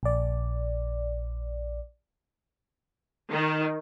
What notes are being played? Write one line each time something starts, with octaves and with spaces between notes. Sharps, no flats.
A#1 D5
D#3